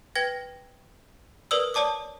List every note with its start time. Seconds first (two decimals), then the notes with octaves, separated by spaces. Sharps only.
0.15 B4 G5 G#6 A#6
1.51 A#4 B4 D5 D#6 E6
1.74 C#5 D5 A5 D6 D#6